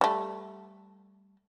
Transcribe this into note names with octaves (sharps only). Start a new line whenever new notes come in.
G3 A3